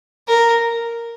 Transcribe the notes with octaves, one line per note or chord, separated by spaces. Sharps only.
A#4